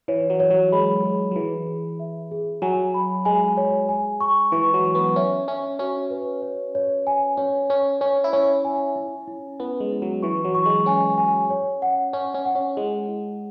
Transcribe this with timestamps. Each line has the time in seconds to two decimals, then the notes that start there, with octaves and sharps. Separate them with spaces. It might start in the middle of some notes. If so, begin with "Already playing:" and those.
0.08 E3 C#5
0.30 F#3
0.40 C#5
0.51 F#3
0.72 G#3 B5
1.03 G#4
1.31 F#3
1.36 E3 G#4
1.67 G#4
2.00 E5
2.31 G#4
2.62 F#3 G#5
2.94 B5
3.25 G#3 G#5
3.57 C#5
3.89 G#5
4.21 C#6
4.52 E3 C#6
4.74 F#3
4.85 C#6
4.95 B3
5.16 C#4 E5
5.48 C#4 E5
5.79 C#4 F#4
6.10 B4
6.42 C#5
6.75 C#5
7.07 G#5
7.37 C#4 C#5
7.69 C#4 C#5
8.01 C#4 C#5
8.24 E4
8.33 C#4 C#5
8.65 G#5
8.96 E4
9.27 E4
9.60 B3 E4
9.80 G#3
9.92 E4
10.02 F#3
10.23 E3 C#6
10.45 F#3
10.55 C#6
10.66 G#3
10.86 C#4 G#5
11.18 G#5
11.50 C#5
11.82 F#5
12.13 C#4 C#5
12.34 C#4
12.46 F#5
12.55 C#4
12.77 G#3 E4
13.08 E4